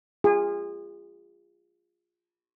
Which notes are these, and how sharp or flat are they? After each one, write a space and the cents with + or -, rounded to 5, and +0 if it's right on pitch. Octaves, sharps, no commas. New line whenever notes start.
F4 +0 G#4 -30